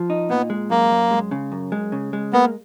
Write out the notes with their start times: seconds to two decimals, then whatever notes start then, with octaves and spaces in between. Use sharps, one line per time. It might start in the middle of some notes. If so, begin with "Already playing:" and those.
Already playing: F3
0.10 D#4
0.30 A#2 B3
0.50 G#3
0.70 F#2 A#3
0.91 F#2
1.11 G#3
1.31 C#3
1.52 F#2
1.72 G#3
1.92 C#3
2.13 G#3
2.33 A#3 B3